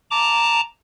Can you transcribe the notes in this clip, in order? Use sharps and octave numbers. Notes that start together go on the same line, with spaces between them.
A5 A#5 D6